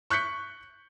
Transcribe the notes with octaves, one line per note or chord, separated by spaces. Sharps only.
C#6 F#6 G6 B6 C#7